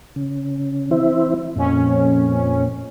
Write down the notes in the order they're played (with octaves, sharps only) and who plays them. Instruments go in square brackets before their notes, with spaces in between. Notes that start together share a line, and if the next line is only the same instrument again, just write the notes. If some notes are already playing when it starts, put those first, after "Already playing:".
[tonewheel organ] C#3
E3 C4 E4
[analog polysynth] F2 C#4 [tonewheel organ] A#2